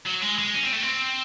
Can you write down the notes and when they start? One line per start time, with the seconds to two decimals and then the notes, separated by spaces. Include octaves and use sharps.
0.07 F#3
0.22 G#3
0.39 G#3
0.54 C#4
0.63 C4
0.73 A3
0.82 C4